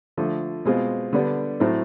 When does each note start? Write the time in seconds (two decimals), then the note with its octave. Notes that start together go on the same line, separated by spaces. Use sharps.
0.18 D3 F3 A3
0.65 B2 G#3 C4 F4
1.13 D3 G3 B3 D4
1.60 A2 F#3 A3 C4